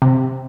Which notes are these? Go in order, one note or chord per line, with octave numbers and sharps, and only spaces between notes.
C3